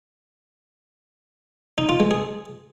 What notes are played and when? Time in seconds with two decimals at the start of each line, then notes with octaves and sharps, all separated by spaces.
1.78 D#4
1.89 F4
2.00 G#3
2.11 G#4